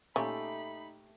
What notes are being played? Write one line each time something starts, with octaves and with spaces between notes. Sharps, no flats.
A#2 A3 C#4 D#4 G4 B5